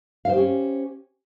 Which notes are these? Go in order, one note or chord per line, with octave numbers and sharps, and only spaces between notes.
C#4 G4 C5 F5